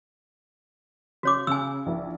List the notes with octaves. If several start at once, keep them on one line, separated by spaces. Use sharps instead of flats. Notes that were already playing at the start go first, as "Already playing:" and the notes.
C#3 F#4 C#5 D6
C#3 G#5 E6
A#1 E4